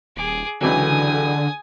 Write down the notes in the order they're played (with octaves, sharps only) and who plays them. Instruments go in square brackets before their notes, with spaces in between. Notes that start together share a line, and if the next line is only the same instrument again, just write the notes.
[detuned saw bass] D#1 [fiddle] G#4 D6
[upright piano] C#2 E3 F#3 [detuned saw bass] D3 [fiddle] G#5 D#6